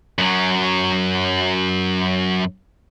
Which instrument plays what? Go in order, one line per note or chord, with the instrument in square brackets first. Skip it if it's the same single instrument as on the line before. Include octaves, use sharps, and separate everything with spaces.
[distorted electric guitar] F#2 F#3